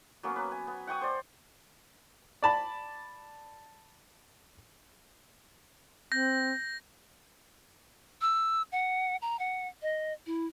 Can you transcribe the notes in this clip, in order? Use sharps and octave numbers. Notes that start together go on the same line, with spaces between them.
F#3 A#3 B3 C#4
B4
G#5
B3
F#5 G5 C#6 D#6
C5 D5
D5 A5 B5
C4 G6 A#6
E6
F#5
A#5
F#5
D#5
E4